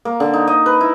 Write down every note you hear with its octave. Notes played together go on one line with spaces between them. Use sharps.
A#3
D3
D#4
D#5
B4
E4